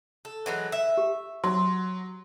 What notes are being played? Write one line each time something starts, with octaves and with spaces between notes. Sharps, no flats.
A4
E3 F#3 G#3
E5
G4
F#3 C6